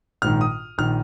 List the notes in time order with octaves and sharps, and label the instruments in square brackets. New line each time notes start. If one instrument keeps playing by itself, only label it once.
[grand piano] A#1 G#2 D#3 F6
D#6
A#1 D#3 F6